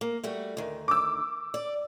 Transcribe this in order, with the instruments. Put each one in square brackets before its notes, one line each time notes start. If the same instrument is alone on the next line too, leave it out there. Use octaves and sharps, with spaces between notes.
[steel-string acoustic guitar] A#3
G3 A3 F#4
D2 D#3
[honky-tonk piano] D6 E6
[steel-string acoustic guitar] D5